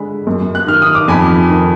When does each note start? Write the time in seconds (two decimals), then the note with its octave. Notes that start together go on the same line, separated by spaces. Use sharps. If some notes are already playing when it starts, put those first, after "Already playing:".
Already playing: D3 G#3 B5
0.27 F#2
0.55 F#6
0.67 D#3 F6
0.82 D#6
0.95 D6
1.08 F2 G#5 B5
1.50 D#3